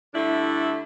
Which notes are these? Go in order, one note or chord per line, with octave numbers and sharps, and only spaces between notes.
D3 G3 A3 D4 E4